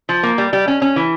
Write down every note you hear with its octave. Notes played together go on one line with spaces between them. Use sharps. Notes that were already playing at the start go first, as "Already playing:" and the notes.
F3
A#3
G3
G3
C#4
C#4
E3